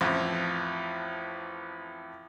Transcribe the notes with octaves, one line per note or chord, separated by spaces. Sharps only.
A1 F2